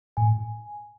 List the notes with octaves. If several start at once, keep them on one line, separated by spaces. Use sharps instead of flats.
A2 G#5